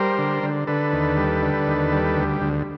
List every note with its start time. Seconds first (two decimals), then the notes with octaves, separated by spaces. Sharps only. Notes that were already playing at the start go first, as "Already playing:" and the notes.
Already playing: G3 A#4 C5
0.18 D3
0.43 D3
0.67 D3 A4 B4
0.93 D#2
1.17 G3
1.43 D3
1.67 D#2
1.92 G3
2.17 D2
2.41 D2